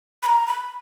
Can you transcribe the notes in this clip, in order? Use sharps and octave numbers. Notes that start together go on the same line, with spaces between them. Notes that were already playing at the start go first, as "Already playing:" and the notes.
B5
A#5
B5